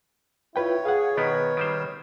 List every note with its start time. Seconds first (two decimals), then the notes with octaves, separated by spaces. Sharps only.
0.56 E4 F4 B4 C#5 G5
0.85 G#4 F5 F#5
1.17 B2 D#3 B3 B4 D#5
1.57 D#3 G3 C5